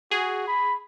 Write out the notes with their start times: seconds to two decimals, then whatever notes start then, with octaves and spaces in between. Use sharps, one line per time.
0.11 F#4 G#4
0.48 B5